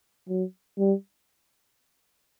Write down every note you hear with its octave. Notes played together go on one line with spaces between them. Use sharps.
F#3
G3